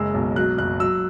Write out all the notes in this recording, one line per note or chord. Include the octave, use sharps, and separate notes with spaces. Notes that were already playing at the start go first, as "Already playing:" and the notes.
Already playing: F#1 G#3 E6
B1
F#3 F#6
F#1 F#6
F#3 E6